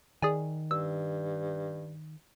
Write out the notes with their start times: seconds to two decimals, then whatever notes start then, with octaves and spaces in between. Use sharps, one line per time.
0.22 D#3 G#4 D5 G#5
0.71 G2 E6